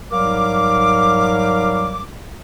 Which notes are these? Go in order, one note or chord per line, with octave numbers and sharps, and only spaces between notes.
G#2 F#3 G3 A#4 F5 D6